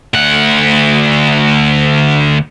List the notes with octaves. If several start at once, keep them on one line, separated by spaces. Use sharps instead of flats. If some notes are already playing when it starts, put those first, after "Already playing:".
D2 F#5